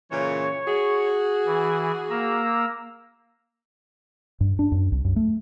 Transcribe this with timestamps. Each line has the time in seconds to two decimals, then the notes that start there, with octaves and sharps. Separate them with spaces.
0.11 A#2 C#3 E3 C#5
0.66 F#4 G#4
1.46 E3
2.10 A#3 A#5 E6
4.41 G2
4.59 D4
4.72 F#2
4.92 C2
5.05 F#2
5.16 A3